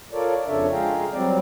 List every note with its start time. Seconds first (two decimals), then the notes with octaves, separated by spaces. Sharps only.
0.13 F4 A4 A#4 C#5 D5
0.47 F2 C#3 D4 A4 C#5 E5
0.72 G#3 F4 G#4 F5 G5 A#5
1.13 F#3 G3 C4 D5